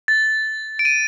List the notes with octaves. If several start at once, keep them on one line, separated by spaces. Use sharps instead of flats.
A6
D7
D#7